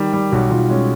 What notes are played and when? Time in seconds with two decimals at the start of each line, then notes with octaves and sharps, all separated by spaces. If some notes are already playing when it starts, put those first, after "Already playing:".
Already playing: D#3 G3
0.13 G3
0.32 B1 F#4
0.50 B1 F4
0.69 G#3 C#4